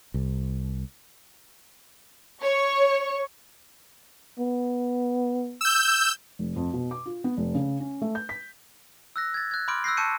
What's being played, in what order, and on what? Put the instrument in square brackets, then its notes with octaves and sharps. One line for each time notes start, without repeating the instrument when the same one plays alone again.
[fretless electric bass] C2
[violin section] C#5 C#6
[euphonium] B3
[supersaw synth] E6 G6
[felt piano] F1
F2
B2
D6
F4
B3
F1
C#3
C#4
A3
G6
B6
[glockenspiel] E6 F#6 A#6
G#6 A6
F#6 G#6
B5 C6 D6 F6 G6 D7
E6 F#6 G6 A#6 C7
A5 C#6 G6 C#7 D#7